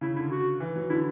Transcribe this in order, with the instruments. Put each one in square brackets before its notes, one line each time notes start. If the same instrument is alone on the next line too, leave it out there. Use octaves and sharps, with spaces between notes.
[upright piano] C#3 [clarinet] E4
[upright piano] D3 [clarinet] E4
[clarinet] F#4
[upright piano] E3
F#3
[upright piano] D3 [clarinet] E4